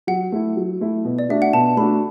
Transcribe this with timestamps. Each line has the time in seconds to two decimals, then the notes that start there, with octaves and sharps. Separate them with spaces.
0.07 F#3 F#5
0.32 A3 E4
0.57 F#3
0.81 A3 E4
1.05 B2
1.19 D5
1.29 A3 D4 F#4 E5
1.42 F#5
1.53 B2 A5
1.77 A3 D4 F#4 B5